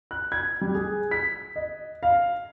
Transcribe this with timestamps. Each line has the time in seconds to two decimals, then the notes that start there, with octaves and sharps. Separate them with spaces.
0.11 F#6
0.32 G#6
0.61 G3
0.75 G#4
1.11 B6
1.56 D#5
2.03 F5